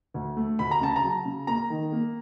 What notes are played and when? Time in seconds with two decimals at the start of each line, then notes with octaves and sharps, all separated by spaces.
0.14 D2
0.37 A3
0.59 D2 B5
0.71 A#5
0.81 C#3 A5
0.96 A#5
1.03 F#3
1.25 C#3
1.47 A#3 A#5
1.70 D#3
1.92 A#3